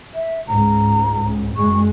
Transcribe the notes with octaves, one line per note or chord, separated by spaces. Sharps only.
E5
C#2 G#2 A#5
F#1 G#3 C#6